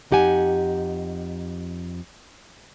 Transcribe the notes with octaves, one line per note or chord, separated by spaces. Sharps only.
F2 D#4 G4 F#5 G#5